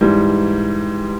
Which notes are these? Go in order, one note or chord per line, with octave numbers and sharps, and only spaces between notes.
G#2 E3 G3